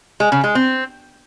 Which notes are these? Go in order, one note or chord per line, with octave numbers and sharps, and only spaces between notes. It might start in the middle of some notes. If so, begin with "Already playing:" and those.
G#3
C#3
G#3
C4